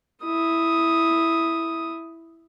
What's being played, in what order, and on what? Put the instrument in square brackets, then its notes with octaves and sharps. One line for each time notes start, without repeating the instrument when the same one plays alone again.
[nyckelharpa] E4 D#6